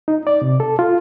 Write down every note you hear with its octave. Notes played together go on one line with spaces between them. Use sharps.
D#4
D5
C3
A4
F4